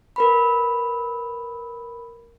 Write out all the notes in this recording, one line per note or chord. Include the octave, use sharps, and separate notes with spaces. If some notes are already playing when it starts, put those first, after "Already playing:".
A#4 B4 B5